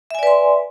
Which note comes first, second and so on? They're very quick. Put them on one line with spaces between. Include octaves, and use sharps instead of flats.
E5 G#5 D5 B4 C6